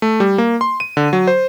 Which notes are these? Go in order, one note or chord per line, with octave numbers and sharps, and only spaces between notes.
A3
G3
A#3
C6
D#7
D3
F#3
C5